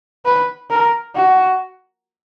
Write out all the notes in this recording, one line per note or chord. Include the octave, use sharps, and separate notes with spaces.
B4
A#4
F#4